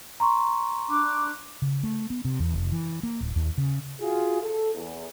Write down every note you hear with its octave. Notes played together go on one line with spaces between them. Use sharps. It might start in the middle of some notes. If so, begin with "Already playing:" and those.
A#5 C6 C#6
D4 D6 F#6
C#3
A3
B3
C3
E2
F1
E3
A#3
D1
D#2
C#3
F4 F#4 G#4
A4
E2